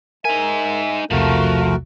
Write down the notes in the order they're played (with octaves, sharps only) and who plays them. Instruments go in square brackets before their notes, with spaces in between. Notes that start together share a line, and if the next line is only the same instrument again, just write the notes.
[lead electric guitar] D#4 G#5 [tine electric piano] A#4 [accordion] E5
[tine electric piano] B1 E2 C3 [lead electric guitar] F3 [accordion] A3 F#4 A#4